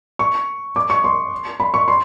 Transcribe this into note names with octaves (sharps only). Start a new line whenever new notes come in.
C#6
D6
C#6
C6
B5
C#6
C6